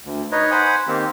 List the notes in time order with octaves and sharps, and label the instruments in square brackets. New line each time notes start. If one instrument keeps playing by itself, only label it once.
[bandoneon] D2
D#4 B4 C#5 D#5
C5 F#5 G#5 B5
D#3 A#3 C4 G4